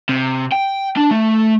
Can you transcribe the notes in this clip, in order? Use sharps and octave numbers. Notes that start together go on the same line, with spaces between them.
C3
G5
D4
A3